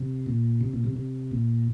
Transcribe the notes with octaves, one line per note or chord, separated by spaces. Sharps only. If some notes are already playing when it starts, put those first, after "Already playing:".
Already playing: C3
A#2
C3
A#2
C3
C3
A#2